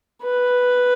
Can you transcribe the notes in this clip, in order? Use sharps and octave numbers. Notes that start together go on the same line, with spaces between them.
B4